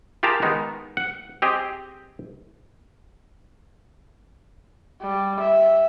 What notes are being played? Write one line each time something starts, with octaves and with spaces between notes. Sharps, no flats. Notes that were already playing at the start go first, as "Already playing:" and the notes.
F4 G4 G#4 A#4 A5 A#5
D#3 G#3 B3 D#4
F#5
C4 G4 G#4 D#5
G3
E5